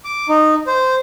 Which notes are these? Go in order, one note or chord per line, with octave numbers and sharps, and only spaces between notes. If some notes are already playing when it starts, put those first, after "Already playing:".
D6
D#4
C5